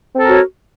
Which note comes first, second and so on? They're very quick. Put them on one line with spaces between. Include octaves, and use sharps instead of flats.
C4 A4 A#4 F#4 C#5